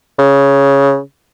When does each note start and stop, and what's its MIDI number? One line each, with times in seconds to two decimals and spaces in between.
0.18 0.98 49